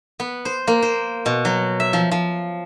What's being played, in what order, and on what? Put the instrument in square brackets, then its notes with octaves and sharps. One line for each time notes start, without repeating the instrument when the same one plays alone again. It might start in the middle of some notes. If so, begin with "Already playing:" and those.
[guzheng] B3
C5
A#3
C5
B2
F#3
E5
F3
F3